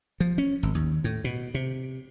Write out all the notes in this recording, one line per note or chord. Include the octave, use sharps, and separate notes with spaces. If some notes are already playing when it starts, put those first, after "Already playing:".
F3
C#4
G#1
D#2
A2
B2
C3